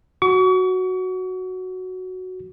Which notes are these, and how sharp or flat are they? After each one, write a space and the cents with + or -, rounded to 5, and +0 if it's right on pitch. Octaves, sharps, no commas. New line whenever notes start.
F#4 +0 C#6 +35